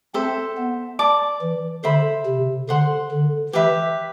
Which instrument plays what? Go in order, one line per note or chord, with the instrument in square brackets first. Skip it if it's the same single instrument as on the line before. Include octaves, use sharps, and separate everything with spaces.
[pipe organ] C4 [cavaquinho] A4 C5 E5
[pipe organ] B3
[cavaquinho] D5 A5 D6
[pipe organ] E3
[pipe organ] D3 [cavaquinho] C5 E5 B5
[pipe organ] C3
[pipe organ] D3 [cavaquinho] C5 F#5 C6
[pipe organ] D3
[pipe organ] E3 [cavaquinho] G4 B4 E5